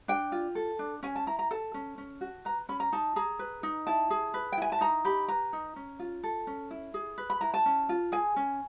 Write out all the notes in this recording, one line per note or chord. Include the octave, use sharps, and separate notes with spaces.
D4 G5
F4
A4
D4
C#4 G#5
A5
E4 A#5
A#5
A4 A5
C#4
C#4
F#4
B4 A#5
C#4 B5
A#5
D#4 A5
G#4 A#5
B4
D#4
E4 A5
G#4
B4
G5
E4 G#5
A5
D#4 A#5
G4 B5
B4 A#5
D#4
C#4
F4
A4
C#4
E4
G#4
B4
B5
E4 A#5
A5
C#4
F4
G#4 G#5
C#4